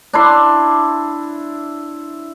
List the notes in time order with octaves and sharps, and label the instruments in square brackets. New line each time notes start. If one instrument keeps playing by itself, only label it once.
[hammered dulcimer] D4 E4 C6